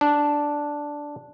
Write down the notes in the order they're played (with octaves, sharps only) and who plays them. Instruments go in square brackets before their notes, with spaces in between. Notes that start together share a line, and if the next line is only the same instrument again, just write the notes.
[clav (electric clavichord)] D4